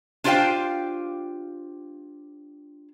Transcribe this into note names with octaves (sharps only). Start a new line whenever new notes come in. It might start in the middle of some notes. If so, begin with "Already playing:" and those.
D4 F4 G4 C5 F5 G5